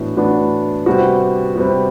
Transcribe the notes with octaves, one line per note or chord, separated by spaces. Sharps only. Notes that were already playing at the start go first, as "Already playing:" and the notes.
Already playing: A2 E3 B3 D4 F#4
A2 E3 B3 D4 F#4
C3 G3 B3 F#4
C3 G3 B3 F#4